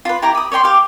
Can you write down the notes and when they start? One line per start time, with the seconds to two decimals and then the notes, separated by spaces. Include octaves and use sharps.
0.05 F4 B4
0.22 E4 G4 A#5 D6
0.35 B5 D#6
0.52 C#5 D5 G5 C6
0.64 G4 F5